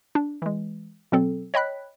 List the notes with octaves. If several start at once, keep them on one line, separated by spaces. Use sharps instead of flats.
D4
E3 G#3
B2 F#3 C4 A4
C#5 D#5 G5 B5 F#6 B6